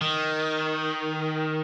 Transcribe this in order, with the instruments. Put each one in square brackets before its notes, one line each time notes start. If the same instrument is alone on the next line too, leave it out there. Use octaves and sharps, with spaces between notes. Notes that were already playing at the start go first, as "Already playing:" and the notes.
[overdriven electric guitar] D#3